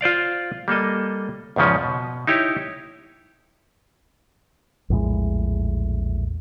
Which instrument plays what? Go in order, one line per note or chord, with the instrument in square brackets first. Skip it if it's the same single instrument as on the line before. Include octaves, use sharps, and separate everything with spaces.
[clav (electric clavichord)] F4 C5 D5 F5
G3 A#3 A4 D#5
E2 G#2 C#3 F3 C#4
B2
D#4 E4 G4 C#5
[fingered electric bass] A#1 E2 A2 G#3